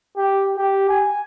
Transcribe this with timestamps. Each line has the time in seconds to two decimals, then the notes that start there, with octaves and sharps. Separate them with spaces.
0.17 G4
0.57 G4
0.89 G#5